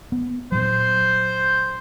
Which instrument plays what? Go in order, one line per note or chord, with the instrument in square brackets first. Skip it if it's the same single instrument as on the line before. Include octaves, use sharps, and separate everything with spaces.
[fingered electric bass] B3
[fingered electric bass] A#2 F#3 [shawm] C5